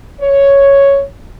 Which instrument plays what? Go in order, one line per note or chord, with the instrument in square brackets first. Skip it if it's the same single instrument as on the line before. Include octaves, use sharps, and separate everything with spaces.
[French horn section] C#5